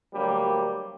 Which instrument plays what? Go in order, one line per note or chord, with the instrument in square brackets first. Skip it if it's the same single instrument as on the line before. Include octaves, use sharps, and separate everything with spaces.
[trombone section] D2 F#3 G3 A#3